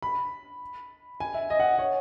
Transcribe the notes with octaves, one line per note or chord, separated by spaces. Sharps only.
B5
G#5
E5
D#5
F#5
C#5